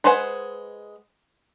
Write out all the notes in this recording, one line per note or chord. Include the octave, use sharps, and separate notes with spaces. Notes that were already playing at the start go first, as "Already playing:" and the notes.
G#3 B4 C5 F#5 G#5